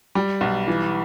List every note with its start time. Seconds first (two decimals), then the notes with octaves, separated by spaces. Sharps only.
0.15 G3
0.41 B1
0.68 E3